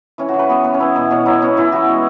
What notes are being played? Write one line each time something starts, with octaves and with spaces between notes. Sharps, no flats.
E3 C#4
F#4
E3
B4
B3 F#4
B3
C#4
B3 E4
B2 E4
B2 C#4
F#3 E4
B3 C#4
E3 E4
E3 F#4
G#3